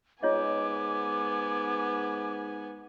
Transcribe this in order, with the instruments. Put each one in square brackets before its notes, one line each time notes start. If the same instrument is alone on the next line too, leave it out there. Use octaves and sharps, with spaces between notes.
[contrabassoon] G#2 [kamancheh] B3 G#5 [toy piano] F4 C#5 D#5 [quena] D6